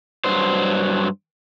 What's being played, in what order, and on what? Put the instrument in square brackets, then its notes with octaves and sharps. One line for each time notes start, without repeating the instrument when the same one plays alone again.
[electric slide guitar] G2 F#3 C5